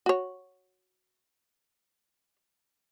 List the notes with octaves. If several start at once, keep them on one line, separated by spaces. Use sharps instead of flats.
F#4 C#5